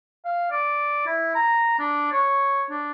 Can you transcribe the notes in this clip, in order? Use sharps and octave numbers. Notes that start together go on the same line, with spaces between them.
F5
D5
E4
A#5
D4
C#5
D4